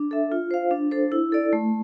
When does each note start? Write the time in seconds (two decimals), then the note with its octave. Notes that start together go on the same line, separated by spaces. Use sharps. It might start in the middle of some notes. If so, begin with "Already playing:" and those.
Already playing: D4
0.11 A4 E5
0.32 F4
0.51 C5 F5
0.71 D4
0.91 A4 C5
1.12 E4
1.32 A4 D5
1.53 A3